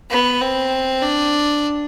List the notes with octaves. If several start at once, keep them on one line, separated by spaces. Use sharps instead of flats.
B3
C4
D4